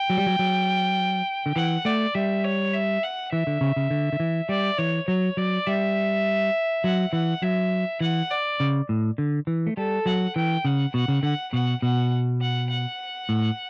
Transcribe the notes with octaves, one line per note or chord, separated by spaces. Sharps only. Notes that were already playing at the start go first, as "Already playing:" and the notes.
Already playing: G5
F#3
G3
F#3
F#3
D3
E3 F#5
A3 D5
G3 E5
C#5
E5
F#5
E3 E5
D3
C#3
C#3
D3
D3
E3
G3 D5
E3 C#5
F#3 C#5
F#3 D5
G3 E5
F#3 F#5
E3 F#5
F#3 E5
E3 F#5
D5
C#3
A2
D3
E3
A3
G3 A4
F#3 F#5
E3 G5
C#3 F#5
B2 F#5
C#3
D3 F#5
B2 F#5
B2 F#5
F#5
F#5
A2